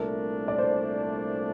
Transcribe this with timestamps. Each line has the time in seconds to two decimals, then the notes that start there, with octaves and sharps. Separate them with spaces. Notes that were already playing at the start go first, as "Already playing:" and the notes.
Already playing: C2 A#2 A3 D4 A#4
0.48 D5
0.58 C5